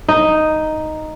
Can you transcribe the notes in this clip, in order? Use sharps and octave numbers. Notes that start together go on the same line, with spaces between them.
D#4